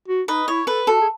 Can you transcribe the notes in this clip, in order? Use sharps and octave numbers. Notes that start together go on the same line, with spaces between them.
F#4
D#4 B4 D#5
E4 C#5
A4 B4
F#4 A4
G#4